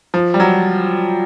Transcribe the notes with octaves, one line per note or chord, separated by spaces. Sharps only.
F3
G3
F#3